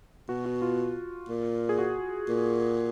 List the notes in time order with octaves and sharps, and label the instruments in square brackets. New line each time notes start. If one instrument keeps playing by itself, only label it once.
[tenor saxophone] B2 [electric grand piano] F#4
[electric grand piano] F#4
F4
[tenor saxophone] A#2
[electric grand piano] G#4
F#4
[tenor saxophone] A#2